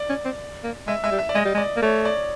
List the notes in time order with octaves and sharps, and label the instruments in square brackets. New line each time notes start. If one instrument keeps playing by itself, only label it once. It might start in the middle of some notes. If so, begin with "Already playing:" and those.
Already playing: [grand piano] D5
[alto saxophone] C#4
C4
A#3
[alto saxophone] G#3 [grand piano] E5
[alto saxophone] G#3 [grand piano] E5
[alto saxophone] G3
[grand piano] E5
D5
[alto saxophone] G#3 [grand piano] D#5
[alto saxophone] G3
G#3
[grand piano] D5
[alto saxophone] A#3
[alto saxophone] A3 [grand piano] C#5
[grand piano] D5